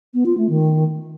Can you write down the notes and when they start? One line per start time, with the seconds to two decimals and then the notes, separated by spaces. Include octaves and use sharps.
0.14 B3
0.26 F4
0.38 A3
0.50 D#3